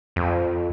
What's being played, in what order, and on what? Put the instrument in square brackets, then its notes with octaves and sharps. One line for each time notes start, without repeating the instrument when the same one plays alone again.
[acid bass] F2